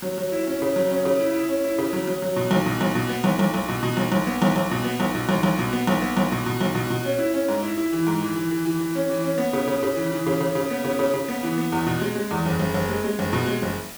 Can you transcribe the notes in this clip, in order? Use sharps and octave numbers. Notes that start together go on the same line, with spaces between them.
F#3
F#3
E4
C#4
C#3
F#3
C#4
C#3
E4
E4
C#4
E4
C#3
F#3
F#3
F#3
B2
B1
B2
B1
B2
B3
B1
B1
B1
B2
B2
B1
B1
B3
B1
B1
B2
B3
B1
B2
B1
B1
B2
B3
B1
B3
B1
B2
B2
B1
B2
B2
C#4
E4
C#4
G#2
E4
E4
E3
G#2
E3
E3
E3
E3
E3
C#4
E3
C#4
B3
C#3
C#3
C#3
E3
E3
C#3
C#3
C#3
B3
C#3
C#3
C#3
B3
E3
B3
E2
B2
G#3
G#3
E2
F#1
F#1
F#1
G#3
G#3
F#1
B2
G#3
F#1